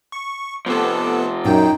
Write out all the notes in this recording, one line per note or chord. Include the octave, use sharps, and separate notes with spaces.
C#6
C3 F3 B3 A4
F#2 A#2 D#4 G5